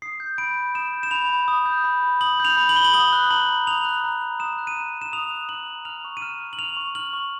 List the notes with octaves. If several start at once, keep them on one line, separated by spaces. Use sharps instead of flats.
D#6 C7
G6
B5 D7
B5
D#6 E7
G6
E7
B5 F7
B5
D#6
G6
B5
B5
D#6 F#7
G6 F7
B5
F#7
B5 G7
F#7
D#6 G7
F#6
A#5 F#7
A#5
D#6 F7
F#6
A#5
A#5
D#6 E7
F#6
D#7
A#5 E7
A#5
E7
D#6 F7
F#6
A#5 F#7
A#5
F6 F7
C#6
D#7
F6 E7
C#6
F#7
F6 F7
C#6
F6 F#7
C#6